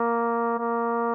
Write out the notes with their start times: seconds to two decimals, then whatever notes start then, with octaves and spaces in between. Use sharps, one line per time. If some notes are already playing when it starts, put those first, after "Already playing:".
Already playing: A#3
0.58 A#3